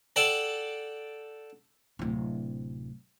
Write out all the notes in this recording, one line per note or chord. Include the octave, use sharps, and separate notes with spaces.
A4 D5 F#5 G5 A5
D1 C3